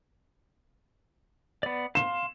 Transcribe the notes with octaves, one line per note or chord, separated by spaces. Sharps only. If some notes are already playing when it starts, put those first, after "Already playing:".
B3 D5
F5 C6 E7